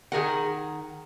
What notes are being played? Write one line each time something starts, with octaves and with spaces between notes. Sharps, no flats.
D#3 G#4 A#4 F#5